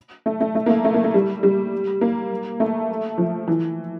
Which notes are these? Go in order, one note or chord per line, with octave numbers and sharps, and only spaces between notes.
A3
A3
A3
A#3
A3
A3
A#3
A3
G3
G3
A#3
A3
F3
E3